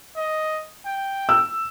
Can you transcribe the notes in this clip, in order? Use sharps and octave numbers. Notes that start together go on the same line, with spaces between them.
D#5
G5
E6